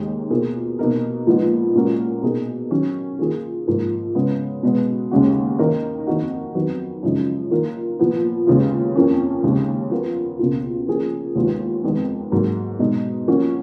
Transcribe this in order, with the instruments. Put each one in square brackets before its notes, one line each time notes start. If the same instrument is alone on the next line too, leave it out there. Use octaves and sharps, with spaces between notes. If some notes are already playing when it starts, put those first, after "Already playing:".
Already playing: [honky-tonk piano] D#2 D#3 G#3 D#4 G#4
B2 A#3 F4 G#4
B2 A#3 D#4 A#4
A#2 F3 G#3 B3 D#4
A#2 G#3 C#4 F#4 A#4
B2 A#3 D#4 G#4
D#3 F#3 C#4
D#3 A#3 F4 G#4
G#2 F3 A#3
C#3 G#3 B3
B2 G#3 B3
D#2 C#3 G#3 C#4 F#4
D#3 A#3 D#4 A#4
F2 D#3 A#3 D#4 F#4
F2 D#3 F#3 B3
F#2 C#3 F3 G#3 D#4
D#3 A#3 F4 A#4
A#2 F3 B3
D#2 C#3 G#3 B3 F4
F2 F3 A#3 C#4
D#2 C#3 G#3
F3 B3 F4 A#4
C#2 B2 A#3 F4
F3 A#3 C#4 G#4
D#2 D#3 G#3 B3 F4
F2 D#3 G#3 B3
G#2 F#3 A#3
B2 G#3 D#4
F3 A#3 C#4 F#4